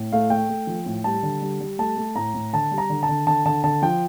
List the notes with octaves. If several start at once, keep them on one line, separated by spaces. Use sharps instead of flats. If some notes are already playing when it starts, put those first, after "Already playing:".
Already playing: A2
A3 F5
A3 G5
A3
F3
A2
G3 A5
D3
G3
G3
A3 A5
A3
A2 A#5
A2
D3 A5
G3
A#5
D3
A5
D3
D3 A5
D3 A5
D3 A5
F3 G5